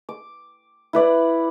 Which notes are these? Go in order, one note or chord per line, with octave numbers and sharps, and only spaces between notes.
D6
E4 B4 D5 F#5